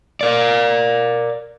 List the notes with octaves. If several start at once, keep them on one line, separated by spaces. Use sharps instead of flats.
A#4 D5